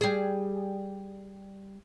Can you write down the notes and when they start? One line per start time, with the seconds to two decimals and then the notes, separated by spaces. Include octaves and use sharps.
0.01 G3 G#4